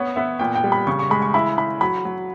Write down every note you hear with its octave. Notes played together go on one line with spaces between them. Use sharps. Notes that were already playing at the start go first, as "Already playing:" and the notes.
Already playing: B3 C#5
B3 E5
A#2 G5
G5
G3
B5
C#3 C#6
C#6
G#3 B5
C#6
E4 B5
E4 B5
F#3 B5
F#3